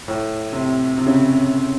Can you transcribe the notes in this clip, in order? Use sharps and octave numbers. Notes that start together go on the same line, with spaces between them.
A2
C3
C3
C#3